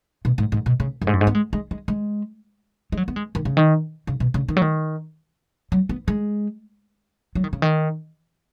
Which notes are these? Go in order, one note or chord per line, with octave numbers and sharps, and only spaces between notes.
B2
G#2
G#2
B2
C#3
F#2
G#2
F#2
G#2
B3
G#3
G#3
G#3
G#3
G#3
F#3
B3
G#3
D#3
C#3
D#3
C#3
B2
C#3
D#3
F#3
D#3
F#3
B3
G#3
F#3
D#3
C#3
D#3